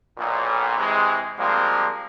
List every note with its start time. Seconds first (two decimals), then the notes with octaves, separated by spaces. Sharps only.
0.17 B1 A#2
0.77 C3 E3 G#3
1.38 F3 G3 G#3 A#3 C4